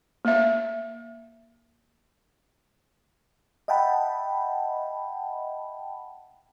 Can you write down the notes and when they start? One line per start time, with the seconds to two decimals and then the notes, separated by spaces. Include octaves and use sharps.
0.25 A#3 E5
3.68 D#5 E5 F#5 G5 A5 B5